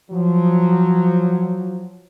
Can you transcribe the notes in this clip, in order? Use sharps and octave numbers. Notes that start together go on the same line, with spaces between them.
F3 F#3